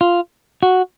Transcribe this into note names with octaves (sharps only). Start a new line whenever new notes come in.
F4
F#4